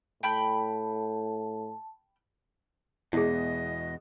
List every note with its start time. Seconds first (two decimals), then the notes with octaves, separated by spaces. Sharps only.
0.23 A2 G5 A5 B5 G6
3.13 E2 B2 G#3 E4 G#4 D#5